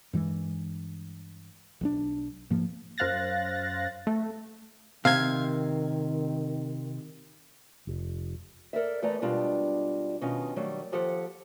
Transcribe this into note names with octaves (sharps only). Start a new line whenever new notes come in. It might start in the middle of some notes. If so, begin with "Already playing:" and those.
G2 E3 G#3
B1 F#3 D4
G#2 F3 A#3
F#2 C5 F5 F#6 A6 A#6
A3
C3 D#3 F5 G#6
F1
A4 A#4 D5 E5
E2 A3 B4 D5 A5 A#5
B2 G3 G#3 D4 F4 G4
B2 D#3 C#4 D#4 F4
D#3 F#3 G3 A3
D#2 F3 G4 A4 F#5